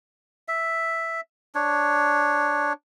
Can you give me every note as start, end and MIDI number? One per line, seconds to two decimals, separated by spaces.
0.48 1.21 76
1.55 2.73 62
1.55 2.73 73